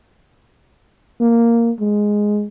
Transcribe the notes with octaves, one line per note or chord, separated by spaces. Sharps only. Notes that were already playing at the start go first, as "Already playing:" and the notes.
A#3
G#3